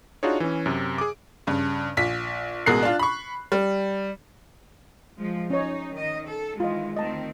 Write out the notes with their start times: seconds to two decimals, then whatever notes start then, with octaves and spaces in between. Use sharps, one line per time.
0.23 D4 D#4 F4 F#4 G#4 C#5
0.40 E3 C#4
0.66 F#2 C3
0.98 G#4 D6
1.47 G2 C#3
1.97 A#1 B6
2.66 A1 B2 G#3 A#4 F#6 C7
2.83 D4 F4
2.99 B5 C#6
3.52 G3
5.18 F3 G#3
5.50 C#4 D#4 C#5
5.92 D#3 D#5
6.30 A4
6.60 D#3 E3 G#3 F4 D#5
6.97 D2 D#3 C4 D#5 A5